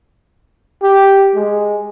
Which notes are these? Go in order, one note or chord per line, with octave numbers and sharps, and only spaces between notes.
G4
G#3